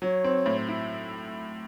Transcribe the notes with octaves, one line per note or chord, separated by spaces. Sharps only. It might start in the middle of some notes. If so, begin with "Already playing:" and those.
F#3 C#5
C4
A2
E4